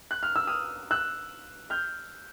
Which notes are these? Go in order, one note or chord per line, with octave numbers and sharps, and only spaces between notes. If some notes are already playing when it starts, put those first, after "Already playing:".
F#6
F6
E6
D#6 F6
E6 F#6
F6 G6